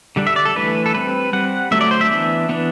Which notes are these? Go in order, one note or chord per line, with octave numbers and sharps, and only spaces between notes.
D3 G3 D4
E5
D5
A4
E3 A3 D4 B4
A4
G3 C4 B4
G3 C4 F#5
D3 F#3 A3 E5
D5
C5
E5
E3 B3 D4
E3 B3 D4